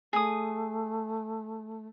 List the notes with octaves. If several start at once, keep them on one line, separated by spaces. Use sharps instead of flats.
A3 G#4 D#6